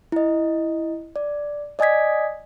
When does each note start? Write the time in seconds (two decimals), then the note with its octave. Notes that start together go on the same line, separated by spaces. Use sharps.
0.12 E4 D#5
1.16 D5
1.79 D5 D#5 G#5 D#6 G#6 B6